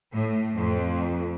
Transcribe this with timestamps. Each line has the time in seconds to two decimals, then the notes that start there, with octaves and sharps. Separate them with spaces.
0.12 A2
0.57 F2